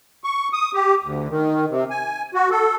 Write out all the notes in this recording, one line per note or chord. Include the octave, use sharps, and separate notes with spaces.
C#6
D#6
G4
D2
D#3
C3
G#5
F#4
A4